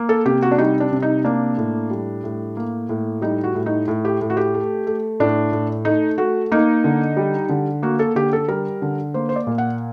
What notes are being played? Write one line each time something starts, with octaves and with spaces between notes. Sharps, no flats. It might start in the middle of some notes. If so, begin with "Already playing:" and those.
Already playing: A#3
A4
C3 G4
F#4
D4
G3 D#4
D4
C3
D#4
A#3 D4
A2
G3
A2
A#3
A2
G3 D#4
F#4
A2
D#4
A2
G4
A2
F#4
G4
A3
A3
A2 D4
A2
A3 D#4
A3 F#4
A#3 D#4
D3
G3
D3
A#3 F#4
A4
D3 G4
A4
G3 A#4
D3
A#3 C5
C5
D5
A#2
F#5